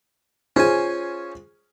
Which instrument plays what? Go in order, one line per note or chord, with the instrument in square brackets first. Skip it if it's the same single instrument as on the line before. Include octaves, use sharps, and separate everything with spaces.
[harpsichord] C#4 G#5 [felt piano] F4 G#4 C5